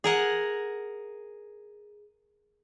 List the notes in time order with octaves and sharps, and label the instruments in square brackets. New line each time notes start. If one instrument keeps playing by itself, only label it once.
[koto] G#4 A#4 F#5